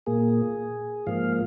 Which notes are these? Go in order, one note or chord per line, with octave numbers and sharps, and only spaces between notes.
A#2 A#3 G#4
G#2 F3 A#3 F5